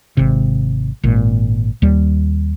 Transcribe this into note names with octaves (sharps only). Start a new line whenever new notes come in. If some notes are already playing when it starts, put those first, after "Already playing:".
G#1 C3
G#1 A#2
D#2 G3